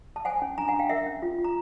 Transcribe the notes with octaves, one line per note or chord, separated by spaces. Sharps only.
A5
C5 F#5 G#5
C#4
D4 G#5 A#5
F#5 G#5
D4
F5 G5
A#4 E5 F#5
C#4
F4
F4
A#5